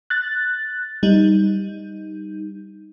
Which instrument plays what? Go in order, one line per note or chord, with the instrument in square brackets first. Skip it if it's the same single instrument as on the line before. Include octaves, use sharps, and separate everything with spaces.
[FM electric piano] F#6 A6
G3 D#4